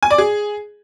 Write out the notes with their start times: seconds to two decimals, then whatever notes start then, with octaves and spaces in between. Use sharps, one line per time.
0.03 G#5
0.10 D5
0.18 G#4